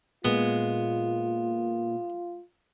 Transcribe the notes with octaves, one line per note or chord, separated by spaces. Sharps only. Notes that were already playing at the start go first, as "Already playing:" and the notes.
A#2 G#3 B3 F4